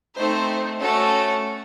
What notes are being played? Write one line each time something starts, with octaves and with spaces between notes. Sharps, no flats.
A3 C4 D#4 C5
A3 C#4 F#4 A4